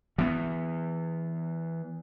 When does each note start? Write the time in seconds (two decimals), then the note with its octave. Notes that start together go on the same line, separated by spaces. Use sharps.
0.18 E3 B3